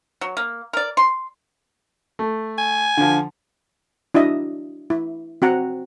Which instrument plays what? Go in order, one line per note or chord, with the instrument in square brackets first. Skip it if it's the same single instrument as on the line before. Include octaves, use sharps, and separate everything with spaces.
[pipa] F#3
A#3
A#4 D5
C6
[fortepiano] A3
[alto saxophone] G#5
[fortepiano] D3 F3
[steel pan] D4 E4 F#4 D#5 E5
E4
C4 F#4 F#5 A#5